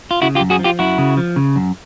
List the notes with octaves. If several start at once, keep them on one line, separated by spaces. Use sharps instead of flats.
F4
C#3 E4 F#4
F4 G4
F#2
F#4 G#4
F3
F4 G4
F#2 E4 F#4
C#3
F3
C#3
F#2